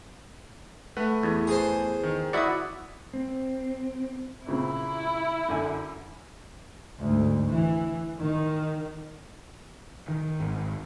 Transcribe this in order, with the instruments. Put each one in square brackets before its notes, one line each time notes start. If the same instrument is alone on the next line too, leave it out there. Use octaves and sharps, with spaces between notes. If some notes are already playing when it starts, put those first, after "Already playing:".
[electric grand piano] A3 B4 F#5
[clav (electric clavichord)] E2
[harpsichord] G#4 C5
[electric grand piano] D#3
[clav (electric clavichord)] E4 F#4 D5 [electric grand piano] D#6 B6 C#7
[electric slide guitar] C4
[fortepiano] A#2 C#3 C4 [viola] E4
[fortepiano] F#2 D3 G#5
[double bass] D2 G#2
E3
D#3
[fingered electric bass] D#3
G#1